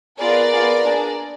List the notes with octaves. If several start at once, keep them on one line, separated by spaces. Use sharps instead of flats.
B3 F4 G#4 A#4 D5
B3 F4 G#4
A#3 D4 G#4